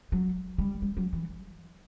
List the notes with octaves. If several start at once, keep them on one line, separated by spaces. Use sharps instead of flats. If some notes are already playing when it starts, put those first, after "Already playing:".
F#3
G3
G3
F#3
E3